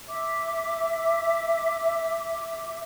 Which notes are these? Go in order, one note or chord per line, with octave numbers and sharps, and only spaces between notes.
E5 D6